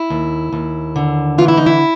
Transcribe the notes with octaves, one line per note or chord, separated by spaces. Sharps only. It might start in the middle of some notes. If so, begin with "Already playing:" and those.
Already playing: E4
D#2
D#2
D3
E3 F4
E4
D#4
E4